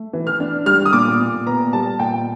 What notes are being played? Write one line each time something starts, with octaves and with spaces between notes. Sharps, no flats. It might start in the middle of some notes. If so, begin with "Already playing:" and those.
Already playing: A3
E3
F6
D4
G3 F6
D#6
A#2 D6
A#2
B3 A#5
G3 A5
A#2 G5